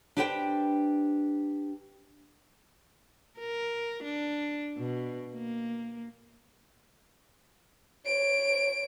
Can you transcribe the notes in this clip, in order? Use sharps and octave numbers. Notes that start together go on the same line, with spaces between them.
D4 G4 B4 C5 E5 G5
A#4
D4
B2
A#3
C#5 D7